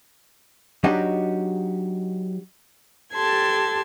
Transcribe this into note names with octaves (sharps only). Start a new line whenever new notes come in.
F#3 D4 D#4 F#4 G4 D#5
G4 A4 A5 C6 G#6